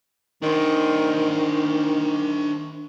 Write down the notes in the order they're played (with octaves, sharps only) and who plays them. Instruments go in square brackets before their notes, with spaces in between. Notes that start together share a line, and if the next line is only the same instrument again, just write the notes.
[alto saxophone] D#3 [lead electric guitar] D4 C5